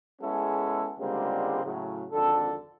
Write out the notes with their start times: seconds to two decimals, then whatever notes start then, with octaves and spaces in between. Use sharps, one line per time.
0.21 G#3 B3 C#4 E4 G#4 A4
0.98 C#2 D3 G3 G#3 A#3 C4
1.64 A2 C#3 F#3
2.12 G#1 F2 D3 A4